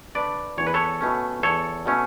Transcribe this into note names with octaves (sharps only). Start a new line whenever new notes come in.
D3 A3 D4 B4 D5
E2 C#5
B4
A4 C#5
B2 A3 C#4
E2 A4 C#5
B2 A3 C#4